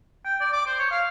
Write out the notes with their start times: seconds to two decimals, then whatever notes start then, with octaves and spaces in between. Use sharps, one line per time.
0.25 G5
0.41 D5
0.53 D6
0.67 C5
0.79 C#5
0.91 F5